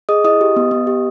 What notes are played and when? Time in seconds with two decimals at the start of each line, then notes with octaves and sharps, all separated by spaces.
0.09 G#4 D#5 D#6
0.24 E4 D#5 D#6
0.41 G4
0.56 B3
0.71 B3
0.87 G4